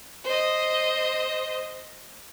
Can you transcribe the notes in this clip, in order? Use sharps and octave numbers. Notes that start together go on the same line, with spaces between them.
C5 D#5